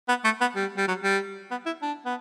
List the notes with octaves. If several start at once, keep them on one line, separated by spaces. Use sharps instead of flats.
B3
A3
B3
G3
G3
F#3
G3
B3
E4
D4
B3